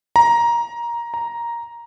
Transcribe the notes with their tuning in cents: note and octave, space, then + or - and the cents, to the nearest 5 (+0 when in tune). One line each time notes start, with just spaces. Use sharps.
A#5 +15
A#5 +5